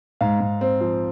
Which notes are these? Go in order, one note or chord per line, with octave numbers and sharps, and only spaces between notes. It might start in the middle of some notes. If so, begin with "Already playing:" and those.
G#2 F5
G#2
C4
F3